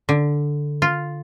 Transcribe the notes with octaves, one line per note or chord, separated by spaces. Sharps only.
D3
F4